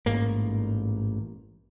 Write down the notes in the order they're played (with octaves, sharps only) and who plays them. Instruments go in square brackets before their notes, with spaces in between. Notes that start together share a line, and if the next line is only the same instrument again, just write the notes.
[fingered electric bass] A1 G#2 A#3